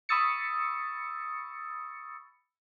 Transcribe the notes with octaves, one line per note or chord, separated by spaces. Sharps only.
B5 C#6 D#6 E6 A6 C#7